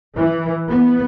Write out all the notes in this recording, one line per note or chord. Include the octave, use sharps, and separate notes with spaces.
E3
B3